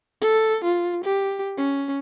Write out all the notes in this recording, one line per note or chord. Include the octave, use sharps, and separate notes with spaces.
A4
F4
G4
C#4